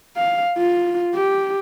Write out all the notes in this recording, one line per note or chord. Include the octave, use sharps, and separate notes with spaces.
F5
F4
G4